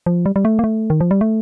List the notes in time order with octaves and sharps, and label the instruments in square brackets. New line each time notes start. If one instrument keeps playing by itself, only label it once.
[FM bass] F3
G3
G3
A3
A#3
A3
D#3
F3
G3
A3